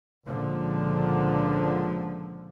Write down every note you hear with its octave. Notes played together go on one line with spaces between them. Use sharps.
C#2 A#2 D3 F3